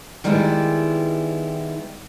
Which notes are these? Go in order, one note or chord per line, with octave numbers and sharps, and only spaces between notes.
D#3 G3 G#3 B3 E4